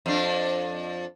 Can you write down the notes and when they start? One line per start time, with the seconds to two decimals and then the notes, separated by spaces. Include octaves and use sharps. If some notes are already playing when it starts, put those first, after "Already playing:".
0.06 F2 D4